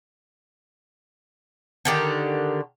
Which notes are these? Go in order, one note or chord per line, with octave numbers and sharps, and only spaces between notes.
D3 D#3 G4